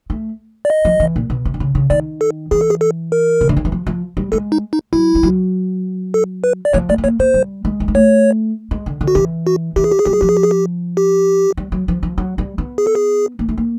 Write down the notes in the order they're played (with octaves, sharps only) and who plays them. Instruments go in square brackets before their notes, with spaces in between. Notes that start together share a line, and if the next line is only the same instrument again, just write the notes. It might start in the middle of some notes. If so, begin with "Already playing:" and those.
[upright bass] A3
[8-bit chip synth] D5
D#5
[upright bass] F3
E3
A#2
B2
C3
D3
C#3
C#3
[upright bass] D#3 [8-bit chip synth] D5
[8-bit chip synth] A4
[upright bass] E3 [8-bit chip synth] G#4
[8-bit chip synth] A4
G#4
A4
A#4
[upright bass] C#3
D3
D#3
E3
F3
F3
G3
[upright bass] G#3 [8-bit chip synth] A4
[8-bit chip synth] D#4
D#4
[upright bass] F#3 [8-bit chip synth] E4
[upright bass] G3
F#3
[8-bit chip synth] A4
B4
D5
[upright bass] F3 [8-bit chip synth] C#5
[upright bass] A3 [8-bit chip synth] D5
[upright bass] B3
[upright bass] A#3 [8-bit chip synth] C#5
[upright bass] A#3 [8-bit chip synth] C5
[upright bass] G3
G#3
B3
A#3
[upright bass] A3 [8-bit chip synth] C#5
[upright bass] G#3
D3
D3
[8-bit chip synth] F#4
[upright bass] E3 [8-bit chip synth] G4
[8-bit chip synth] F#4
[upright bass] E3 [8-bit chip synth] G4
[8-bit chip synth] G#4
G4
G#4
[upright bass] F#3 [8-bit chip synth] G4
[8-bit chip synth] G#4
[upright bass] F3 [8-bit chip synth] G4
[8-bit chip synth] G#4
G4
G#4
G4
G4
[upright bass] G3
F#3
F3
F3
F#3
G3
B3
[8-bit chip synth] G#4
A4
G#4
[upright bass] A#3
A3
A#3